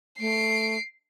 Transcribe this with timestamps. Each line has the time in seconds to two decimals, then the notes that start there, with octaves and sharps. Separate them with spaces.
0.20 A3 C7 D7